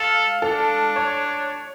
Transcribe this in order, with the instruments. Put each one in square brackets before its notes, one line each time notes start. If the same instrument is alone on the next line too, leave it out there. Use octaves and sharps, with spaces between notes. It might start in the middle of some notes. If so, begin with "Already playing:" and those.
Already playing: [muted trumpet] A4 [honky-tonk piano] F5
[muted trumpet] D4 [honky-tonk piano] A4
[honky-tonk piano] C#5